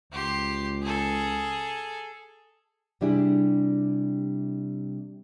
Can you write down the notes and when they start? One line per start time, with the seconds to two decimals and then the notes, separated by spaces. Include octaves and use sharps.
0.13 C#2 G4 C6
0.83 G#4 A4
3.01 C3 G3 D4 E4 G#4